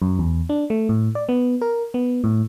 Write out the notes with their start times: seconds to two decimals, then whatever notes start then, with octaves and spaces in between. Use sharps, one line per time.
0.02 F#2
0.19 E2
0.49 D4
0.70 A3
0.89 A2
1.15 D5
1.29 B3
1.61 A#4
1.94 B3
2.24 A2